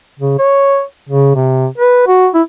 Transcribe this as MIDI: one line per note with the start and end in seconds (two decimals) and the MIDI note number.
0.20 0.38 49
0.39 0.82 73
1.09 1.33 49
1.36 1.66 48
1.78 2.06 71
2.07 2.28 66
2.34 2.42 64